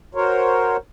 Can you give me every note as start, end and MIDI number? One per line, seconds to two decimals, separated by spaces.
0.15 0.77 66
0.15 0.77 70
0.15 0.77 72
0.15 0.77 73